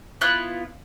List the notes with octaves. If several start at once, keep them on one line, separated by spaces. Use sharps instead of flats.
B3 E4 F4 F#6